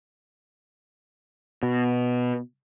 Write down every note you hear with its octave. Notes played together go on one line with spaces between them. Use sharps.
B2